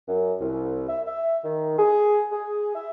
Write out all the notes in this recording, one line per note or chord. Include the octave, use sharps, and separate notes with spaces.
F#2
C2
E5
E5
D#3
G#4
G#4
E5